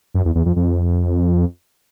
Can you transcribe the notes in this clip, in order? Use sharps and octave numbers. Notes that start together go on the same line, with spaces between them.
F#2
E2
E2
F2
F2